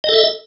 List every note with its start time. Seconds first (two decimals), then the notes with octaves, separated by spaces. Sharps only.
0.04 D#5
0.09 A4
0.13 E5